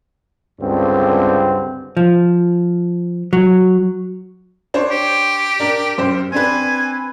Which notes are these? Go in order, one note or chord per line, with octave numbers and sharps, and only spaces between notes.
C#2 G2 D3 C4
F3
F#3
D4 C5 C#5
G4
D4 A#4 D5
F#2 C5
C4 D4 B4 G#5